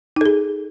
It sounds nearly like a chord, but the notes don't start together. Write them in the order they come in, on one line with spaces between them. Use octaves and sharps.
D#4 A4 G#4